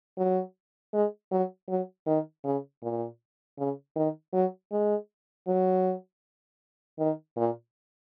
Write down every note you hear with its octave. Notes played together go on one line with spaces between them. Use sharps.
F#3
G#3
F#3
F#3
D#3
C#3
A#2
C#3
D#3
F#3
G#3
F#3
D#3
A#2